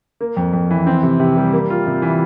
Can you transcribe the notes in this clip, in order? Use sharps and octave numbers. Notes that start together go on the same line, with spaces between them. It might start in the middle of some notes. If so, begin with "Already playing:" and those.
A#3
F2
F2
E3
C4
C3
C3
G3
A#3
F4
C3
E3